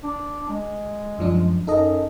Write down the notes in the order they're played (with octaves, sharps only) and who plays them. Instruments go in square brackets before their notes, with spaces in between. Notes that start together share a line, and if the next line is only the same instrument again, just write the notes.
[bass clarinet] D4
G#3
[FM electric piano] F#2 F3 D4
[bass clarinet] F#2 [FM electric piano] D#4 A4 D#5